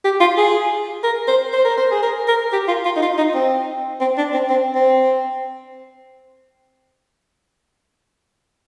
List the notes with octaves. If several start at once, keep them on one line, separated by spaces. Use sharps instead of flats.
G4
F4
G#4
A#4
C5
C5
A#4
C5
G#4
A#4
A#4
G4
F4
F4
D#4
F4
D#4
C4
C4
D4
C4
C4
C4